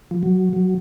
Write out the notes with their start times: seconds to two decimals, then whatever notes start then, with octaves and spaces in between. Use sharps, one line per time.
0.11 F3
0.23 F#3
0.53 F#3